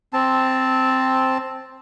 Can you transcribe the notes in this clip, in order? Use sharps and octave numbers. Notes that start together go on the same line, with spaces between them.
C4 A5